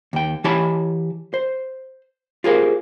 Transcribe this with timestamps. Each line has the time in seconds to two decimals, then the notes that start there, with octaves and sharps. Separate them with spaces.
0.13 D#2 G5
0.44 E3 E4 G4 C#5 A5 B5
1.34 C5
2.44 F4 G4 G#4 A#4 C5 F5